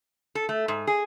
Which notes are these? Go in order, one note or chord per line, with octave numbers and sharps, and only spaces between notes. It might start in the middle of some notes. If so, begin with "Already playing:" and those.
A4
A3
G#2
G#4